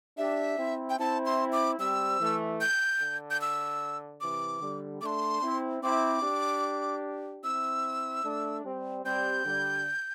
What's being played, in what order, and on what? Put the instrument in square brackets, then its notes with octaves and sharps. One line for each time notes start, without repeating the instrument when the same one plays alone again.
[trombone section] D4 G4 [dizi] E5
[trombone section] C4 E4
[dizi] G5
[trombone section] C4 E4 [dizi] A5
[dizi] C6
D6
[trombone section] G3 C4 [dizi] E6
[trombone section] E3 A3
[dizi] G6
[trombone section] D3
[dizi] G6
E6
[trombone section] C3 E3 [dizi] D6
[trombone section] D3 G3
[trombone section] A3 D4 [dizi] C6 D6
[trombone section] C4 E4
[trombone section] C4 E4 [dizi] D6
[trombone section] D4 G4
[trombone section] C4 E4 [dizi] E6
[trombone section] A3 D4
G3 C4
[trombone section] G3 C4 [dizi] G6
[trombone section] D3 G3